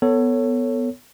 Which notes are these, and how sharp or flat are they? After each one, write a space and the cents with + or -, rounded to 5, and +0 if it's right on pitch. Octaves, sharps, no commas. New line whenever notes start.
B3 +5 A4 +20 C#5 +0